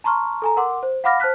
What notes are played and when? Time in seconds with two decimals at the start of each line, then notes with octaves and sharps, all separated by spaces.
0.04 A5 A#5 C6 C#6 F6
0.42 A4 G#5 A#5
0.57 A#4 F#5 C6 D6
0.83 C5
1.04 F5 F#5 B5 D6 F6 A#6
1.20 C5 A5 F6 F#6 B6